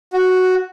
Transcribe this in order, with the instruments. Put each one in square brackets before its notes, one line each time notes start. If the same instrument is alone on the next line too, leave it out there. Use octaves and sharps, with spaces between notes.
[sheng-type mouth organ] F#4